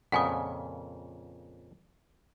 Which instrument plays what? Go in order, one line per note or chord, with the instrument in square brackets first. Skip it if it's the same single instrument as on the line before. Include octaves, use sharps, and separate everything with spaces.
[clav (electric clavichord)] F2 A#2 C#3 [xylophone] F#5 G#5 D#6